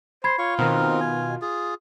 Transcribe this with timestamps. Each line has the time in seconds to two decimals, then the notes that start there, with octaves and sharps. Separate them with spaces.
0.24 C5 B5 G#6 C7
0.38 F4 C#5 C#6
0.59 B2 D#3 C4 D#4 A#4
1.00 G#5
1.42 F4 G#4